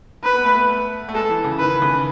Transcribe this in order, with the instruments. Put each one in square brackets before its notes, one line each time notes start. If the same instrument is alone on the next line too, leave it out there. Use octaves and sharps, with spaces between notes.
[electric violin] B4
[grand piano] B3
A3
B3
A3
A3
[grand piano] G#3 [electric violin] A4
[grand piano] E3
C#3
[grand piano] D#3 [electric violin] B4
[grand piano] C#3